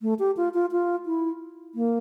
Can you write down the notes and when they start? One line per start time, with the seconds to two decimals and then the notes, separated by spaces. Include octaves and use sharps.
0.02 A3
0.19 G4
0.37 F4
0.54 F4
0.71 F4
1.06 E4
1.75 A#3